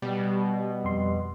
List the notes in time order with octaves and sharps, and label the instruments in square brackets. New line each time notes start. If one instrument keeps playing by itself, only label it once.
[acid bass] B2 [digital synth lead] G3
[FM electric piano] F2 C6